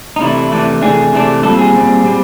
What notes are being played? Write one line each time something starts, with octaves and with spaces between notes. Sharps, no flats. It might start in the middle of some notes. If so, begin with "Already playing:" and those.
D#4
C3 E3 A3 D4 E4
C3 E3 A3 D4
C3 E3 A3 D4 G#4
C3 E3 A3 D4
A#2 G3 C4 A4
G#4
A#2 G3 C4
A#2 G3 C4